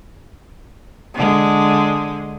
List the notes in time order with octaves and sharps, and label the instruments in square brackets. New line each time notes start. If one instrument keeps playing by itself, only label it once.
[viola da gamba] D3 G#3